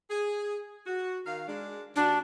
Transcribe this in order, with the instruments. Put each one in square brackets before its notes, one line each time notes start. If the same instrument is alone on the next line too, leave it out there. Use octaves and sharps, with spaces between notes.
[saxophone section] G#4
F#4
D#3 A#4 F5
G#3 D4
[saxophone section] D#2 F#4 [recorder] D4